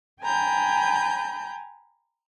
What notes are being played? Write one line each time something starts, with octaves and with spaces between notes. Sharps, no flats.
G5 G#5 A#5 B5 G6